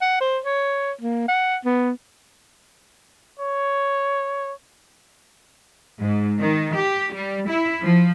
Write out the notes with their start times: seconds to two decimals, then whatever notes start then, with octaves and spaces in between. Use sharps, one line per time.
0.01 F#5
0.21 C5
0.44 C#5
1.01 A#3
1.28 F#5
1.65 B3
3.40 C#5
6.00 G#2
6.39 D#3
6.76 G4
7.14 G3
7.49 E4
7.83 F3